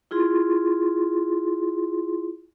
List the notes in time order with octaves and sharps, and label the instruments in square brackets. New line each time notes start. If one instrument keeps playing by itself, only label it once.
[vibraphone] E4 F4 G#4 C6